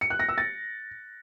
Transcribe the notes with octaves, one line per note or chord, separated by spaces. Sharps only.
C#7
F#6
A#6
E6
A6